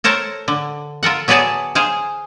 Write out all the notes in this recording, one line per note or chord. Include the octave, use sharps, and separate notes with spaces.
A4 A#4 C5 C#5 A5
D3
F4 A4 A#4 F#5
F#3 B3 F#4 G#4 D5 A5
G#4 C5 F5